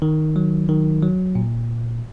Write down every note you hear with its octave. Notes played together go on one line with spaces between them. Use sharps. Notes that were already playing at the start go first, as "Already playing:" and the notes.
D#3
F#3
D#3
F#3
A#2